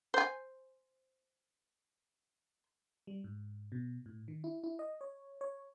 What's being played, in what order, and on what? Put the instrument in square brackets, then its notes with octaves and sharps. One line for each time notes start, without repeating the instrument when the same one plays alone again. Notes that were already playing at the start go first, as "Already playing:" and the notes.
[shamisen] C5 G#5
[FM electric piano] G3
G#2
B2
A2
D#3
E4
E4
D#5
C#5
C#5